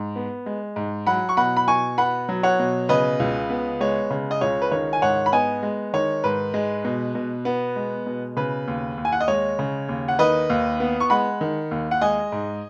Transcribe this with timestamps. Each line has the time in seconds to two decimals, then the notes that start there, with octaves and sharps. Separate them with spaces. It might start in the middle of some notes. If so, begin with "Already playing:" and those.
Already playing: G#2
0.16 B3
0.46 G#3
0.76 G#2
1.07 F#3 F#5 B5
1.29 C#6
1.37 B2 F#5 B5
1.57 B5
1.68 B2 G#5 C#6
1.98 B3 F#5 B5
2.29 F#3
2.43 C#5 F#5
2.59 B2
2.89 C#3 B4 D#5
3.20 C#2
3.50 B3
3.80 G#3 C#5
4.11 C#3
4.31 D#5
4.41 C#2 C#5
4.62 B4
4.72 D#3 C#5
4.93 G#5
5.02 G#2 C#5 F#5
5.26 B5
5.32 B3 D#5 G#5
5.63 G#3
5.94 D#3 C#5
6.24 G#2 B4
6.54 G#3
6.85 B2
7.15 B2
7.45 B3
7.76 G#3
8.06 B2
8.37 C#3 B4
8.68 D#2
8.97 D#2
9.05 G#5
9.12 F#5
9.20 D#5
9.28 G#3 C#5
9.59 C#3
9.89 D#2
10.08 F#5
10.19 D#3 B4 D#5
10.50 D#2
10.80 B3
11.00 C#6
11.10 G#3 F#5 B5
11.41 D#3
11.71 D#2
11.91 F#5
12.01 G#3 D#5 G#5
12.32 G#2